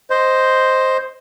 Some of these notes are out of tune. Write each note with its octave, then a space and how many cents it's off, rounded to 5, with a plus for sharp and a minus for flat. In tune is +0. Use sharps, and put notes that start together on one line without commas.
C5 +0 D#5 +0